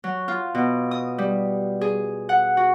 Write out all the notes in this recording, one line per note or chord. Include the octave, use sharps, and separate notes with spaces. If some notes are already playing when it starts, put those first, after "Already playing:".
F#3
F4
B2
D#6
G3
G#4
F#5
F#4